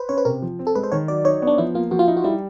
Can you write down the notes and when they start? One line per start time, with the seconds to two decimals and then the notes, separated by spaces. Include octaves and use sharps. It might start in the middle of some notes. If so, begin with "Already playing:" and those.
Already playing: B4 C5
0.09 C#4 C#5
0.18 B4
0.25 C3 A#4
0.42 F3
0.59 C4
0.67 A4
0.75 G#3 B4
0.84 C5
0.92 D#3 C#5
1.08 F#3 D5
1.24 D#4 C#5
1.42 B3
1.47 D4
1.58 F3 E4
1.75 A#3 F4
1.91 F3 F#4
1.99 F4
2.08 D#4 E4
2.17 F#4
2.24 G3 E4